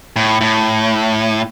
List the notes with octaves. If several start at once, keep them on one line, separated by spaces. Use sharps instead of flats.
A2
A2